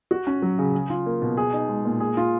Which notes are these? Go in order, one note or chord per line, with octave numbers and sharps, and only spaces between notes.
F#4
C#4
F#3
C#3
G#4
F4
A#3
B2
G#4
D#4
G#3
A#2
G#4
F4